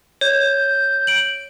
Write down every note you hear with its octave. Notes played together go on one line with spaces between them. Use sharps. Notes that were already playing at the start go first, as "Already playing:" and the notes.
C#5 G6
G6
D7 F#7